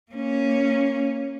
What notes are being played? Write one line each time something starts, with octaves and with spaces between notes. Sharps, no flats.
A#3 C#4